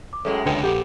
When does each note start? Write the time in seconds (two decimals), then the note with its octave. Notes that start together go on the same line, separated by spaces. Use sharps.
0.13 D6
0.25 F#2 A2 G#3 F#4 G#4 A4
0.46 C#2 D3 B4 D#5 G5
0.63 A#1 G4 A4 F#5